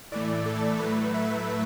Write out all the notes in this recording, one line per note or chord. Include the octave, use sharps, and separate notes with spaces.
A2 E3 A3 D5
A4
A2 F#3 A3 B4
E5